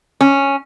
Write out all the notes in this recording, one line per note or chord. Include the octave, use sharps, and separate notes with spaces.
C#4